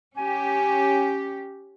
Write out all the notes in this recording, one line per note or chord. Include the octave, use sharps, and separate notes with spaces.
C#4 G4 G#5